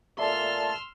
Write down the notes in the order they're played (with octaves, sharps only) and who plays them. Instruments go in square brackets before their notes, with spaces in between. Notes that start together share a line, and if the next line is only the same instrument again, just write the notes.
[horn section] A#2 A5 [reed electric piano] A4 D5 E5 [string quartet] C6 E6 F6